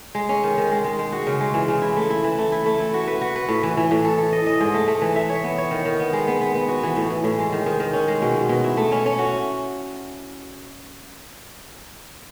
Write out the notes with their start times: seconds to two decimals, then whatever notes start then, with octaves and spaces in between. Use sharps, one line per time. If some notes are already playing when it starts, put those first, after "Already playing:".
0.15 G#3
0.29 C#4
0.43 D#3
0.57 D#3
0.71 G#3
0.84 G#3
0.99 G#3
1.12 F#4
1.27 C#3
1.40 G#3
1.54 E3
1.68 C#3
1.82 E4
1.97 A3
2.10 E4
2.24 E3
2.38 A3
2.52 E4
2.66 A3
2.80 E4
2.94 F#4
3.07 B4
3.21 F#4
3.36 B4
3.49 A2
3.63 E3
3.77 E3
3.91 A2
4.05 A4
4.18 A4
4.33 D#5
4.46 D#5
4.60 G#2
4.74 A3
4.88 A3
5.02 E3
5.16 E5
5.30 C#5
5.44 B3
5.58 C#5
5.71 D#3
5.85 D#3
6.00 B3
6.13 G#3
6.28 B3
6.41 B3
6.55 B3
6.68 F#4
6.83 E3
6.97 A2
7.10 E3
7.24 A2
7.39 G#3
7.52 D#3
7.66 D#3
7.80 D#3
7.93 C#4
8.08 G#3
8.22 B2
8.36 B2
8.49 B2
8.64 E4
8.77 A3
8.92 C#4
9.06 C#4
9.19 F#4